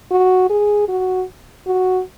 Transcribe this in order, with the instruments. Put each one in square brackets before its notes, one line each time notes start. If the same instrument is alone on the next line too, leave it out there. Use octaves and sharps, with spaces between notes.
[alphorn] F#4
G#4
F#4
F#4